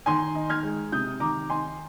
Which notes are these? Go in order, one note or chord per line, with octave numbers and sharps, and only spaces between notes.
D#3 G#5 C6
D#4
F6 G#6
G#3
C3 D#6 G6
D#3 A#5 D6
D#4 G#5 C6